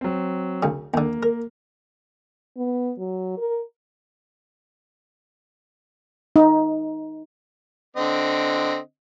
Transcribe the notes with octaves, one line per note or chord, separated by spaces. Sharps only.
F#3 C4
D2 C#3
D#2 D3 A#3
A#4
B3
F#3
A#4
D#4
D3 C4 D#5